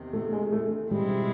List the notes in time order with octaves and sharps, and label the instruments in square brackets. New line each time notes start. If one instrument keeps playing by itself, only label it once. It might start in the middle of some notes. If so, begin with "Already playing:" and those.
Already playing: [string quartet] E2 C3 D#3
[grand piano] A3
G#3
A3
[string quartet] B2 G#3 C4 E4 [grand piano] G3